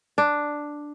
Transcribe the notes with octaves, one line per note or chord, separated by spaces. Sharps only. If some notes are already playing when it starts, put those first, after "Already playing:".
D4